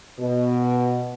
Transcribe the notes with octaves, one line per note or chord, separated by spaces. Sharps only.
B2